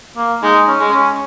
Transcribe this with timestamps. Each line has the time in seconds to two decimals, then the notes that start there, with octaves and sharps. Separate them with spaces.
0.17 A#3
0.43 G#3 D#4
0.68 C#4
0.80 G#3
0.93 C#4